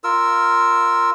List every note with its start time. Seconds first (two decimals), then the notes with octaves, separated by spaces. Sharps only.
0.04 F4 A#4 E6